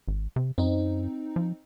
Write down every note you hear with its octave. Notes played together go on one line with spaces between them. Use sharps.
G#1
C3
F#2 C4 D#4
F3